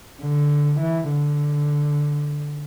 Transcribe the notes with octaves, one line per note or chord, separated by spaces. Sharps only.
D3
E3
D3